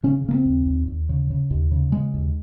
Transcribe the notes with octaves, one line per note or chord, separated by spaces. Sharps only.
C#3 C#4
C#3 A#3
C4
D#2
D#2
D#2
C#3
C#3
D#2
C#3
C#3 G#3
D#2